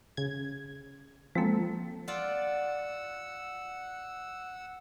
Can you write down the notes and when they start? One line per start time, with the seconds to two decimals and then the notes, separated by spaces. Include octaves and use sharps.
0.17 C#3 G#6
1.35 F3 G#3 A#3 C4 A4
2.08 F4 D5 F#5 E6